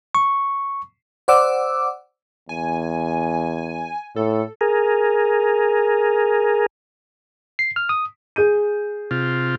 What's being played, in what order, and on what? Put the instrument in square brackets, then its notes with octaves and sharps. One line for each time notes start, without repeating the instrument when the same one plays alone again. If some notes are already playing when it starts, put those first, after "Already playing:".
[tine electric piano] C#6
[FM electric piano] C5 D5 F#5 D6 E6
[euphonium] E2 [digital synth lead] G#5
[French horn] A2 [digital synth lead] A4
[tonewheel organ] G#4 A#4
[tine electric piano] C7
F6
D#6
[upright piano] G#4 G6 D#7
[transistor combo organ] C3 F4